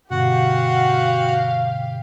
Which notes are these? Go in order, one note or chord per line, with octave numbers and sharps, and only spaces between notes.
G2 B2 D3 F#4 G4 F5 F#5